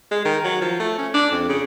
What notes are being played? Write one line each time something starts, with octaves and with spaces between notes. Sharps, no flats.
G#3
D#3
F#3
F3
A3
C#4
D4
F2
C#3